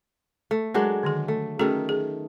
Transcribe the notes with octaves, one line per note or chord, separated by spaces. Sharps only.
A3
F#3 G#3 D4 A#4
D3 D#3 G#4
A3
D#3 A3 C#4 F#4 G#4
G#4